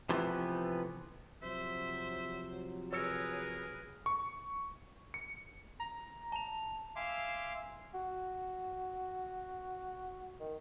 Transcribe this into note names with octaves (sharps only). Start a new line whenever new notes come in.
C3 E3 F3 A3 B3
C3 F3 F#3 C5 E5
G#4 A#4 B4 C#5 E6 C#7
C#6
C#7
A#5
A5 F7
E5 F5 G#5 C6 D6 E6
F#4
D#3